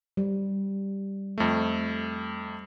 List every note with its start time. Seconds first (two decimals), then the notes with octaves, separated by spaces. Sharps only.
0.17 G3
1.38 F2 A3